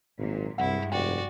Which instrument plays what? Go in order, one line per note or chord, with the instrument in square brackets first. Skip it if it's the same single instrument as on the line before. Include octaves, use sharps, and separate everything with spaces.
[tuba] G#1 [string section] A#2 F#3
[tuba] C2 [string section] G2 G3 G#3 [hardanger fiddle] E4 [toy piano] F#5
[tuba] F1 [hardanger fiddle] F#4 D5 [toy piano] G5